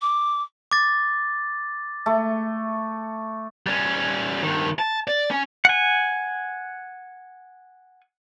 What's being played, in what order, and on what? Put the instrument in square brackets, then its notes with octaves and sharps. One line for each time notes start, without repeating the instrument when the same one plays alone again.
[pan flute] D6
[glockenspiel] D6 A6
[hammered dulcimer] A3
[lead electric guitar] G3 C#4
G2 D#3
A5
D5
C#4
[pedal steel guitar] F#5 G#5